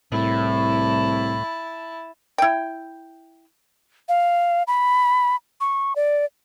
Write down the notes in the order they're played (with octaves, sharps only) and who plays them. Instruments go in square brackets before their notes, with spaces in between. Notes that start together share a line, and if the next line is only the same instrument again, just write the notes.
[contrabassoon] C2 [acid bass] A2 [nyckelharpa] E4 A5
[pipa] E4 G5
[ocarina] F5
B5
C#6
D5